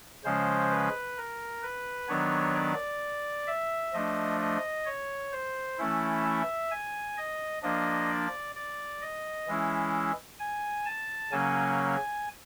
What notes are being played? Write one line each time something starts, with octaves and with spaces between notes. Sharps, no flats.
C#3 F3 G#3 C#4 C5
B4
A#4
B4
D#3 F#3 B3 D4 C#5
D5
E5
F3 A3 D4 D#5
D#5
C#5
C5
E3 A3 C#4 E4
E5
G#5
D#5
F3 A#3 D4 D#5
D5
D5
D#5
E3 G#3 C#4 E4
G#5
A5
C#3 F#3 A#3 C#4 G#5